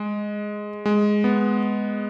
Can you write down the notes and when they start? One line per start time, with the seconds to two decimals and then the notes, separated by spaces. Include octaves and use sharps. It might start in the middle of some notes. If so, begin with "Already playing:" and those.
Already playing: G#3
0.86 G#3
1.24 B3